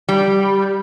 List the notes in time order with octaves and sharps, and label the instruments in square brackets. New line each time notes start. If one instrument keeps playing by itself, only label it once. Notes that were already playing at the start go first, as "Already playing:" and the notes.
[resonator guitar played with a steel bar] G3